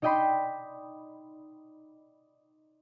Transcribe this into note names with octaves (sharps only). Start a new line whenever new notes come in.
D#4 D5 D#5 G5 B5 C6